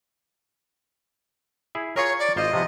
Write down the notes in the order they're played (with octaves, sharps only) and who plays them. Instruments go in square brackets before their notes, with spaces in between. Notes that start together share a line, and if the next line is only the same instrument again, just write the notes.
[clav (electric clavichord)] E4 G#4
[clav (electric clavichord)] F4 G#4 A#4 [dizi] C#5
[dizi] D5
[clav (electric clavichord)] G#1 F4 C5 [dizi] D#5
[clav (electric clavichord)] C3 F3 B3